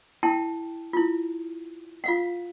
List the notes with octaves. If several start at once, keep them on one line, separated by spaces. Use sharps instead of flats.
E4 G5 A5
E4 F4
F4 F5 F#5